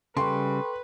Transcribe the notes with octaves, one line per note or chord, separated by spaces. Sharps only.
C#3 G3 A4 B4 G5 C6 C#6